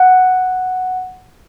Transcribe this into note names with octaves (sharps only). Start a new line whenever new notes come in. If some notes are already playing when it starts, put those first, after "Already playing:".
Already playing: F#5